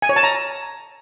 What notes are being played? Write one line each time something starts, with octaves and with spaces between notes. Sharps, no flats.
G#5
C#5
A5
A#5